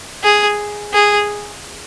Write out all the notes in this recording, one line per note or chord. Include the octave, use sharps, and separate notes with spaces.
G#4
G#4